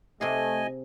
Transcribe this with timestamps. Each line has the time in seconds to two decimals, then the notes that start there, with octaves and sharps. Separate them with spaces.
0.21 C3 A3 G#4 D#5 G#5